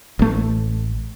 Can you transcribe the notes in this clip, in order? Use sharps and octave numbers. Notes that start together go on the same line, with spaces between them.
A1 A3